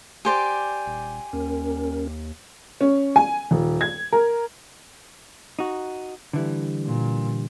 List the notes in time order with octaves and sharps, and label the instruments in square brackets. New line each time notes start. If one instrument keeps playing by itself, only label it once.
[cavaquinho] G4 C5 D5 [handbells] G#5
[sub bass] D#1
[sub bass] D#2 [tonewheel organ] C#4 A#4
[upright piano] C#4
G#5
D#1
G#6
A#4
[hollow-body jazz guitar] D#4 F#4
D3 E3 G3
[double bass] A#2